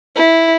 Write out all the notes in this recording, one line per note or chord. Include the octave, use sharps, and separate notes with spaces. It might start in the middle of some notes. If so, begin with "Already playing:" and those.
E4